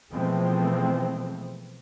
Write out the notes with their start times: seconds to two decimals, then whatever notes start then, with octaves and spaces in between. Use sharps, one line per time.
0.12 B2 E3 F3 G#3 A3 C4